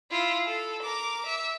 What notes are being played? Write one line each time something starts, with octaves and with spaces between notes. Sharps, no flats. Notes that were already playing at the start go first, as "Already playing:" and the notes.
E4 F4
A4
A#4 D6
E5